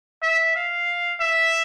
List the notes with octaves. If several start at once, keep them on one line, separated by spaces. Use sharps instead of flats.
E5
F5
E5